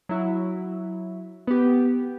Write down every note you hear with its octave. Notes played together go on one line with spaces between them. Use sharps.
F#3 E4
B3 G4